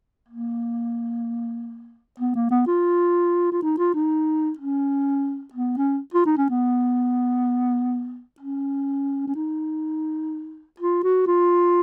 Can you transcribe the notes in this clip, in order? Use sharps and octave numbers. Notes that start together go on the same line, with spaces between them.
A#3
B3
A#3
B3
F4
F4
D#4
F4
D#4
C#4
B3
C#4
F4
D#4
C#4
B3
C#4
C#4
D#4
F4
F#4
F4